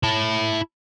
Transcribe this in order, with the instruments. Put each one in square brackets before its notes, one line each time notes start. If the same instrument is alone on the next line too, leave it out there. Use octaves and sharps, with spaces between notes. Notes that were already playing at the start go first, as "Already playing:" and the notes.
[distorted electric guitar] E4 A5